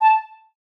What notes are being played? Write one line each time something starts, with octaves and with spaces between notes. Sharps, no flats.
A5